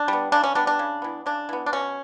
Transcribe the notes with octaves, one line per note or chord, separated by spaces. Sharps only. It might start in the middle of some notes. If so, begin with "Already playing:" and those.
Already playing: D4
G3 B3
C#3 D4
C#4
G3 B3 D4
D4
C#3
E3 B3
C#3 D4
E3 B3
D4
B2 C#4